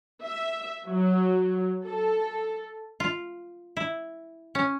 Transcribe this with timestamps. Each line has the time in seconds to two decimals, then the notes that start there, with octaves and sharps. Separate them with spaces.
0.23 E5
0.87 F#3
1.84 A4
3.00 F4
3.77 E4
4.55 C#4